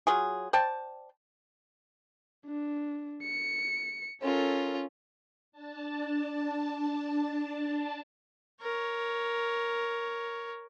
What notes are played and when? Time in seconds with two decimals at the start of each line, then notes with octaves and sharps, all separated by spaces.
0.07 F#3 F4 G#4
0.53 C5 D5 G5 A5
2.46 D4
3.23 C#7
4.22 C#4 F4 A4 A#4
5.52 D4 A5
8.62 A#4 C#5